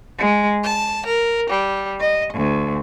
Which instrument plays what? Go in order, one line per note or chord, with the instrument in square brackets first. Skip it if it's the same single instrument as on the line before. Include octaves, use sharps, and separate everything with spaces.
[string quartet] G#3
A5
A#4
G3
D#5
D2